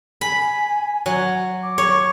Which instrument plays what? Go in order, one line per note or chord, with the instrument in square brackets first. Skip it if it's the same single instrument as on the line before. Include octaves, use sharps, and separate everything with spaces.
[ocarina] G#5 [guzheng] B5
[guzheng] F#3
[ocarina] D6
[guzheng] C#5